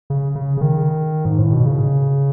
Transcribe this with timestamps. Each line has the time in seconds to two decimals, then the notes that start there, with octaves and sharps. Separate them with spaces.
0.10 C#3
0.35 C#3
0.57 C#3
0.61 D#3
1.25 G#2
1.38 A2
1.52 B2
1.66 C#3